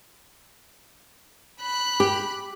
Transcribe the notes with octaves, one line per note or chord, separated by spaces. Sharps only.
B5 F#6
G4